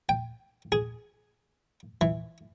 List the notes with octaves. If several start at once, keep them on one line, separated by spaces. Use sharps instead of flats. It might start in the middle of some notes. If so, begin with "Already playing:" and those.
G5
G#4
E3